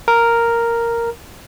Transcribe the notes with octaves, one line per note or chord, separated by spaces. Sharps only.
A#4